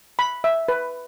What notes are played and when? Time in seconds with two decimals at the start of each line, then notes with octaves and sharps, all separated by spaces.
0.19 B5
0.44 E5
0.69 B4